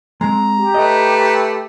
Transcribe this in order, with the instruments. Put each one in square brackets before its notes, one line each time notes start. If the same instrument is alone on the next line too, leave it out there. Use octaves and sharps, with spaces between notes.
[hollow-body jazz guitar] G#3 C4 [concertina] A#5
[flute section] G4
[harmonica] A3 B4 [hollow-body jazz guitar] D#5